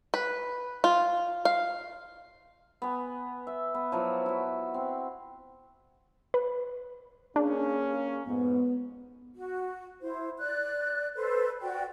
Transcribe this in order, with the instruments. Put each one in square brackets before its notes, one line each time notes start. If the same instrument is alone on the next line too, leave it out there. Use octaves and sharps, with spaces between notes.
[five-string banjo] B4
F4
F5
[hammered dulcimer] B3 G#5
E5
B3
F3 F#3 E4
E4 F#4
C4
[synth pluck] B4
[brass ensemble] A#3 C#4 [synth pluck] D4 [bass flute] G#4
[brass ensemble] F2 G#2 [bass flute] B3
[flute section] F#4
E4 C5
D5 F#6
A4 B4 C5
F#4 D5 G5